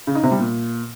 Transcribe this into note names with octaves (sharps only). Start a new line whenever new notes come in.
C#3
D#4
C3
G3
A#2